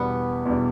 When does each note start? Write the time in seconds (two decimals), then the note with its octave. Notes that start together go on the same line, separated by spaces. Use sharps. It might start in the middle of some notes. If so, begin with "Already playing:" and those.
Already playing: E2 B2 G3 B3 D4
0.45 E2 B2 G3 D4